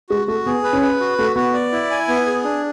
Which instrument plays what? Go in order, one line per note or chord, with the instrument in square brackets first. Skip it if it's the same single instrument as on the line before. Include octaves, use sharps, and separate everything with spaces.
[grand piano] G#3 [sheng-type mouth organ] F#4
[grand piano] A3 [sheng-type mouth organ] F#4
[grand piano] B3 [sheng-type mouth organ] G#4
[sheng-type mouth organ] B4
[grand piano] C#4
[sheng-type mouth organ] B4
F#4
[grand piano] A3 [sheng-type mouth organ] F#4
[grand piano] B3 [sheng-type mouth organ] F#4
[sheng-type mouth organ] D5
E4
G#5
B3
G#4
D4